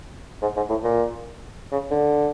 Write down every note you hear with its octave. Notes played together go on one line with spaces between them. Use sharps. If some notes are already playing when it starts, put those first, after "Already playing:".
G#2
G#2
A2
A#2
C#3
D3